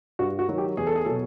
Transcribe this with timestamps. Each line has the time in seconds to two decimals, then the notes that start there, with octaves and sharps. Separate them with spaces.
0.19 G2 F#4
0.39 F#4
0.48 D#3 F#3
0.58 G4
0.77 E2 G#4
0.87 A4
0.96 G#4
1.05 B2 F#3 A4